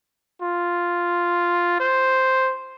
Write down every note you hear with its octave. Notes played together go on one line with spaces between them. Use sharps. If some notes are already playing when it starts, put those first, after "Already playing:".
F4
C5